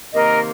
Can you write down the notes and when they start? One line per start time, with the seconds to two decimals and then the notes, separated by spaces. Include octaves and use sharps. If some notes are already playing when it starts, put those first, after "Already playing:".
0.14 C3 D#3 A#3 A#4 D#5